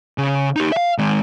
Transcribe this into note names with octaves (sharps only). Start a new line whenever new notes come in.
C#3
D#4 G4
E5 F5
D#3 G#3